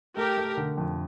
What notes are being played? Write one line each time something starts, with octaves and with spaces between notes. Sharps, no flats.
A3 G4 A#4
A3
D3
F2